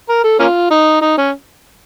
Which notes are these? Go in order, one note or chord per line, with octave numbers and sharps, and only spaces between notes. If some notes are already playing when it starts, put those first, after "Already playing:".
A#4
A4
A#3 C#4 F4
D#4
D#4
C#4